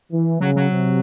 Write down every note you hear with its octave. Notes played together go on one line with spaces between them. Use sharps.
E3
C#3 F#3
F#3
C3